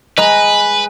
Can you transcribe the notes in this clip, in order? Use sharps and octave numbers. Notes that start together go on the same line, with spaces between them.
G#3 B4 D#5 A#5